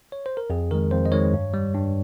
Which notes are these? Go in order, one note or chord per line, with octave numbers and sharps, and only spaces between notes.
C#5
C5
A#4
F2 G#4
D#3 G#3 A#4
F2 C5
D#5
D#3 G#3 C#5
G2
G3
G2